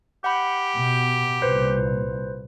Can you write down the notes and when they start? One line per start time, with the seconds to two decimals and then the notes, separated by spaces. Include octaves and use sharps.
0.24 G4 F#5 B5
0.77 B2
1.42 C2 A#2 B4 C5